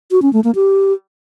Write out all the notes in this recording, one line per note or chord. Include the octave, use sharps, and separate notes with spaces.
F#4
C#4
A3
A#3
G4